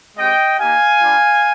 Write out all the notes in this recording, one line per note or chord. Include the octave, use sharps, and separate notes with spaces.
G#3 C4 G4 D#5 G5
A#3 D#4 G4 F5 G#5
G3 D4 F4